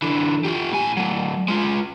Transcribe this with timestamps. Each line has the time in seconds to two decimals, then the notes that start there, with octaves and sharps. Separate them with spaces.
0.02 D3 E3
0.44 F4 G4
0.72 A2 G#5
0.97 F#3 A3
1.48 G#3 F4